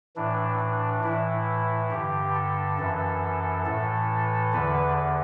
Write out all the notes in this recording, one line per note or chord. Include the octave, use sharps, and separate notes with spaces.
A2 E3 D4
D4
A2 E3 E4
G2 D3 G4
A4
F#2 E3
A2 E3 A4
E2 D3 B4